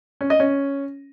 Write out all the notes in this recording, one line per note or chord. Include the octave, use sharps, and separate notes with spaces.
C#4
D#5
C#4